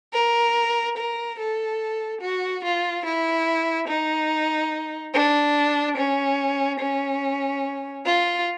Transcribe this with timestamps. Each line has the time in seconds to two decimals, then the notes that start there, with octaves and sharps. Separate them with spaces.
0.13 A#4
0.97 A#4
1.39 A4
2.22 F#4
2.64 F4
3.05 E4
3.88 D#4
5.14 D4
5.97 C#4
6.80 C#4
8.05 F4